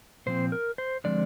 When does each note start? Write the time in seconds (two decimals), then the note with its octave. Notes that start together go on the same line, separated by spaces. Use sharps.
0.26 A#2 F3 C4 C5
0.52 A#4
0.78 C5
1.04 D3 F3 G#3 C4 D5